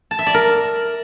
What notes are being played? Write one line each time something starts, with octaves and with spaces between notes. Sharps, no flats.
A5
E5
D5
A#4